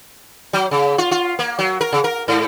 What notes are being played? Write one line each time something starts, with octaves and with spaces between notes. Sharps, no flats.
F#3
C#3
F4
F4
A#3
F#3
A#4
C#3
A#4
G#2